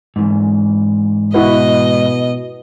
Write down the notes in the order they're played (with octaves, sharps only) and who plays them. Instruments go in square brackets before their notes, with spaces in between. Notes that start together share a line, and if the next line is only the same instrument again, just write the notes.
[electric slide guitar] G#2 E3
[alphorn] B2 [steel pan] E4 F#4 B4 [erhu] D#5